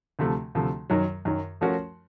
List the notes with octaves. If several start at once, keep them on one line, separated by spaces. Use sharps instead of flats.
D2 C3 F3 A3
D2 C3 F3 A3
F#2 D#3 F#3
F#2 D#3 F#3
F3 A3 C#4 F#4 A#4